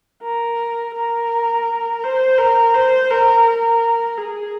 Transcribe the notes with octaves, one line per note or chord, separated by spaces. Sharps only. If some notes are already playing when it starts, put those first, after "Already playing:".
A#4
A#4
C5
A#4
C5
A#4
A#4
G#4